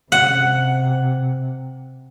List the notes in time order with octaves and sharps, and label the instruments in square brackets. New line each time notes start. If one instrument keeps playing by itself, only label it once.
[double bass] C3 [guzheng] F#5